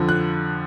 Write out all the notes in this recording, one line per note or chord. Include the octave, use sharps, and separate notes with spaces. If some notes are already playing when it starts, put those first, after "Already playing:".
Already playing: F2 D3 F3
F#6